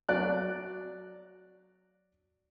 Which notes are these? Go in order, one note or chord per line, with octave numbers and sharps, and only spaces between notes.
F#3 D5 F#6